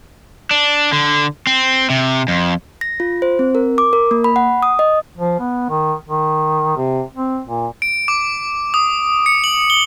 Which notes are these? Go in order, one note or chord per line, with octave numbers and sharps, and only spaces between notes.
D4
D3
C4
C3
F2
A#6
F4
C5
C4
A#4
D6
A#4
A#3
B5
F#5
D#6
D#5
F3
B3
D#3
D#3
C3
C4
A#2
D7
D6
D#6
C#7
F#7
G7